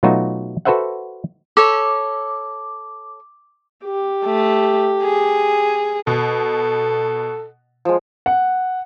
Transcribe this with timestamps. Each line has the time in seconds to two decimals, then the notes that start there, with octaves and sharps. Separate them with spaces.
0.03 B2 F#3 A3 D#4 F4 F#4
0.65 F#4 A4 B4 C5 E5 F#5
1.57 A4 C#5 D6
3.84 G4
4.25 A3
5.04 G#4
6.07 B2 A4
7.85 F3 G#3
8.26 F#5